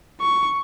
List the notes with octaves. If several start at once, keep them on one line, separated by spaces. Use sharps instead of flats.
C#6